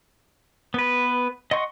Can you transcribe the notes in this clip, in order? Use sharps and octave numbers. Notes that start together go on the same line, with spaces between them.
B3 B4
D#5 F#5 C6 C#6